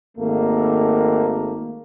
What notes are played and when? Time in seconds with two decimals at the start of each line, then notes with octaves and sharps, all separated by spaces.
0.17 G#1 A3 A#3